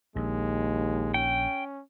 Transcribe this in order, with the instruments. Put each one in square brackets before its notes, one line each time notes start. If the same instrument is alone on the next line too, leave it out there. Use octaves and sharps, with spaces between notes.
[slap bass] A#1 [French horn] D#2 [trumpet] G#3
[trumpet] C#4 [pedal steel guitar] G5